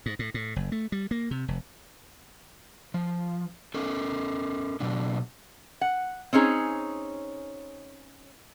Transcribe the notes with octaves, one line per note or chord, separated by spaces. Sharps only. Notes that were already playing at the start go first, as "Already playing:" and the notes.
G#2
A2
A2
F#1
A3
G3
A#3
C3
F1
F3
C#4 A4 A#4
B2 F#3 D4
F#5
C4 C#4 D#4 G#4 C#5